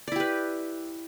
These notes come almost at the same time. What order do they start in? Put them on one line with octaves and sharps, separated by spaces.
D5 E4 G4 B4